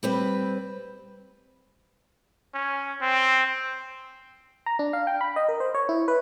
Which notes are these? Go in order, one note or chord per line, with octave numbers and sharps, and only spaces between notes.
G3 C4 B4
C#4
C4
A#5
D4
F5
G5
B5
D#5
A#4
C5
C#5
E4
B4